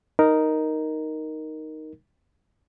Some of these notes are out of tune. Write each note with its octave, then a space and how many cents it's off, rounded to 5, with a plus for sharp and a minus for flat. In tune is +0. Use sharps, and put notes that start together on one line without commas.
D#4 +0 A#4 +0